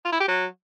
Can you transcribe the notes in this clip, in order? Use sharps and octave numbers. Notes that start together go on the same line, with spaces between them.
F4
E4
G4
F#3